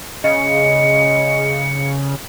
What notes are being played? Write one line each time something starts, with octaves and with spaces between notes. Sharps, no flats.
C#3 G#3 D#5 C#7